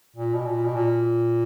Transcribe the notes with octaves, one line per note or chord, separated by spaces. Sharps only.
A#2
B2
A#2
B2
A#2